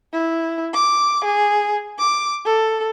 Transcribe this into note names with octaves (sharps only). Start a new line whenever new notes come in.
E4
D6
G#4
D6
A4